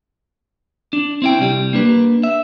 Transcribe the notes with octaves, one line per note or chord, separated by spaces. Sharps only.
D4
C4 E4 G5
C2 G3
A#3 D4 B4
E5